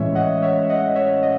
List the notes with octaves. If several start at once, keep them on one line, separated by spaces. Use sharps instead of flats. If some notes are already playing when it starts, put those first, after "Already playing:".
Already playing: A2 E3 G#3 C#4 C#5 E5
D#5 F#5
C#5 E5
D#5 F#5
C#5 E5
D#5